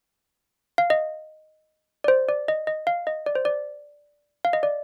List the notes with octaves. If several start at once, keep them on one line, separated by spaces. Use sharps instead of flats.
F5
D#5
D5
C5
D5
D#5
D#5
F5
D#5
D5
C5
D5
F5
D#5
D5